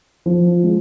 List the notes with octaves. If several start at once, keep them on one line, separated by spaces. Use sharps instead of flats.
F3
G#3